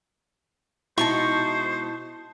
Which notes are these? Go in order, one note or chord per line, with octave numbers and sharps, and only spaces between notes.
B2 G#3 D#4 E4 C5 A5 C#6